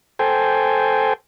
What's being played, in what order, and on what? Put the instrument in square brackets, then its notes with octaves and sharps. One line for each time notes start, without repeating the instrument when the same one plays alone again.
[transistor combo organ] A4 C5 G5 G#5